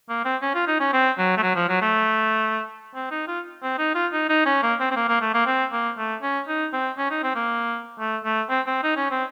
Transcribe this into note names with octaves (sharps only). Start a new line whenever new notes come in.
A#3
C4
C#4
F4
D#4
C#4
C4
F#3
A3
F#3
F3
F#3
A3
C4
D#4
F4
C4
D#4
F4
D#4
D#4
C#4
A#3
C4
C4
A#3
A#3
A3
A#3
C4
A#3
A3
C#4
D#4
C4
C#4
D#4
C4
A#3
A3
A3
C4
C4
D#4
C#4
C4